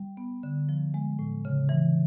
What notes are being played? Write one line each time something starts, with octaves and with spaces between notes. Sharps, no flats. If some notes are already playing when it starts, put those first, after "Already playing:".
Already playing: G3
B3
D3
F3
G#3
A2
C#3
E3